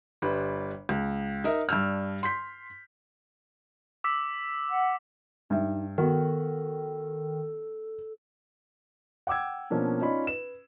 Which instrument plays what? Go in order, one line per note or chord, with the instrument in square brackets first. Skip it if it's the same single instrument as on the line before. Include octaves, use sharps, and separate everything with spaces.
[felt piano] G1 G3 B4
C#2
D#4 A#4 E5
G2 D4 E6 F6
C6 G6 B6
[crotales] D6 E6 B6
[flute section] F#5
[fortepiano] G2 E5 [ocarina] D#4
[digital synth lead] D#3 [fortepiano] B3 F#4 [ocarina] A4
[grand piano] F#5 G5 D6 E6 G#6
B2 F3 A#3 C#4 D4
C#4 D#4 F4 D5 B5
B4 E7